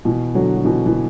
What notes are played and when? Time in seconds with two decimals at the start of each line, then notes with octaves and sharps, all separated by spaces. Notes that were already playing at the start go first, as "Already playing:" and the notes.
0.05 B2 E3
0.35 D3 F#3
0.56 F#3
0.65 B2 E3
0.86 E3